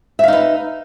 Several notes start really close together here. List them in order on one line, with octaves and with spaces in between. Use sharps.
E5 F5 D#4 B4